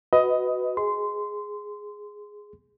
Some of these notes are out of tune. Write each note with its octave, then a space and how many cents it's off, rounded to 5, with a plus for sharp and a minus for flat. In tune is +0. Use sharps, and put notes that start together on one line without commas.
F#4 +0 B4 +15 D#5 +15
G#4 +0 C6 -20